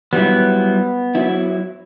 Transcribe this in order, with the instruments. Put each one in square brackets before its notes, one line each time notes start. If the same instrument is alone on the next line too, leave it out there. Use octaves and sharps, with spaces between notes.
[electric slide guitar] F#3 G3 E4 [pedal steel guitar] B3
[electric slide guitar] F#3 E4